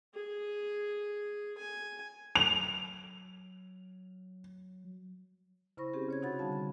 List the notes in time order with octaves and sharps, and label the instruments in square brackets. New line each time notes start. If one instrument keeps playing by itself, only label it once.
[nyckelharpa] G#4
G#5
[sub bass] F#3 [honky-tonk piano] F7
[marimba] C#3 E4 C5 B5 C#6 A#6
C4 C#4 G4 G#4
C#3 C#5 G#6
C3 D#4 F#4 F#5 B5 A6
D3 G3 F5 A5
B5